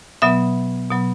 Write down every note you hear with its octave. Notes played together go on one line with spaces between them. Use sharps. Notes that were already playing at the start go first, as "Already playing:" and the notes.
B2 F#3 B3 E5
B2 F#3 B3